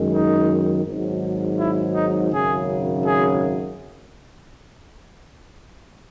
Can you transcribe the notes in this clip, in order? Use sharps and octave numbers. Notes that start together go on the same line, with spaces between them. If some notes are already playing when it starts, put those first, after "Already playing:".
Already playing: F#2 D#3 G#3
D#4
G#1 G#2 F#3
E4
D#4
G#1 F#2 C#3 G#4
G#4